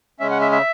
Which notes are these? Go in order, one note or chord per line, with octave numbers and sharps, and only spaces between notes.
C#3 G#3 C#4 E5
F#5
E5
E5